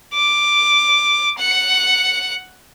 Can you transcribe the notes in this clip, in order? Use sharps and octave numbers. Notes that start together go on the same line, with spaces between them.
D6
F#5 C#7